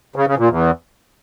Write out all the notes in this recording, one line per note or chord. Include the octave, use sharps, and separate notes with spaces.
C#3
C#3
A#2
E2